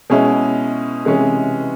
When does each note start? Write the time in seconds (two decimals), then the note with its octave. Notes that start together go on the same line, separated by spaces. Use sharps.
0.10 B2 G#3 C#4 E4
1.05 C3 E3 G#3 C#4